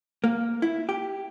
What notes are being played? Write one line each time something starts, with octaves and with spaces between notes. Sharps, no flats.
A#3
E4
G4